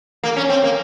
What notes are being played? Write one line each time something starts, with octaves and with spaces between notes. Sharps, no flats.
A#3
C#4
C4
A#3